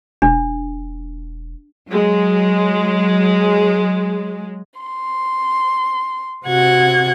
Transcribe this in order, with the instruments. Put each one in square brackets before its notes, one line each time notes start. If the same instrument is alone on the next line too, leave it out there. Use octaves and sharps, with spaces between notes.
[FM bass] E1 [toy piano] D4
[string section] F#3 G#3
[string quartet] C6
C3 F#4 F#5 G#6